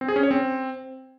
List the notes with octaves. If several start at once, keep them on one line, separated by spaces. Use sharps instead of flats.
C4
G#4
C#4
C#5
C4